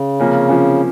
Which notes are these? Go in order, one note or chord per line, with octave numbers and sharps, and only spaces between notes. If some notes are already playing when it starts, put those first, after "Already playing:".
Already playing: C#3
C3 F3 A#3 C#4
C3 F3 A#3 C#4